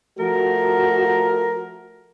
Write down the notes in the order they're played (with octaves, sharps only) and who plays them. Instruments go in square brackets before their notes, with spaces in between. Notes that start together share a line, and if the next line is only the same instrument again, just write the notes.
[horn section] F3 A3 A#4 [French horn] F#4